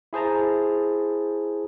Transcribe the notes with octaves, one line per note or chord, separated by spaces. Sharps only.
E4 G#4 C5 A5 A#5